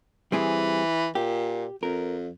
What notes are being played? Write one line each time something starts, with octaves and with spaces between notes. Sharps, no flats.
E3 G3 C4 G#4
A#2 G4
F2 A#4